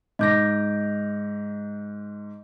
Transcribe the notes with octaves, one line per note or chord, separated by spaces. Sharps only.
G#2 D#5 D6 G6 A#6